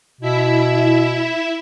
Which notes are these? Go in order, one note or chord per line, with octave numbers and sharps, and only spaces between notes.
B2 E4 E5